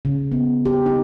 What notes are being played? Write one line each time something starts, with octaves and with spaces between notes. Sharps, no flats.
C#3
B3
G4
D#4